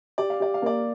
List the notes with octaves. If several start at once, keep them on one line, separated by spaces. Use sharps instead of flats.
G4 D5
F5
G4 D5
F5
A#3 A#4 D5